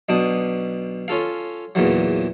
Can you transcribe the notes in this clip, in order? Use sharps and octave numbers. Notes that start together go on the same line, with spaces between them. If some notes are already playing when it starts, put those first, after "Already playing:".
B1 B2 D4 D#6
C#4 F4 A4 F5
E2 A#2 C#3 E3 F#3